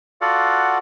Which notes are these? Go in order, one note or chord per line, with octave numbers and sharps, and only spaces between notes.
F4 F#4 A4 D5 F5 F#5